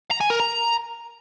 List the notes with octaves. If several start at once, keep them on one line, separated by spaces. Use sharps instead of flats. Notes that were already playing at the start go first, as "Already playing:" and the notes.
A#5
G#5
A#4
A#5